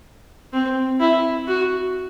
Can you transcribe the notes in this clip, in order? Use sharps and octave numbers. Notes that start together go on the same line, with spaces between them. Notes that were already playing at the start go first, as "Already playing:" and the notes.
C4
E4
F#4